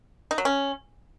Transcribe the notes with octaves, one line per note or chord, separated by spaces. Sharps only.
D#4
F#3
C#4